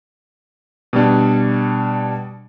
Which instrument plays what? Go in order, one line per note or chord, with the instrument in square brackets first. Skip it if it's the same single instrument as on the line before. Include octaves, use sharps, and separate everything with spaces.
[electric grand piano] B2 G3 D4